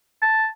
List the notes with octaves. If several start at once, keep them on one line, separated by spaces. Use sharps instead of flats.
A5